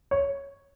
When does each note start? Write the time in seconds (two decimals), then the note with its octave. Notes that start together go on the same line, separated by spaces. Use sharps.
0.11 C#5